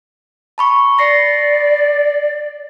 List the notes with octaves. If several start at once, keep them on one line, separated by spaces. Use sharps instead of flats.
A5 B5 C#6
D5 A#6 C7 C#7